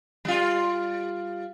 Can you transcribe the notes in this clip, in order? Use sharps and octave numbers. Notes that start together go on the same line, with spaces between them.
G3 F4